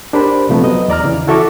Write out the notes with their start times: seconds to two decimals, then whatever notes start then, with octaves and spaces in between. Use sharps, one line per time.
0.13 D4 G4 A#4 C5 B5
0.49 C3 F3 A3 B3
0.64 F#3 B4 D#5
0.88 E2 D5 A#5 F6
1.04 C#3 E3
1.27 E4 F#4 A4 E5 C#6 D6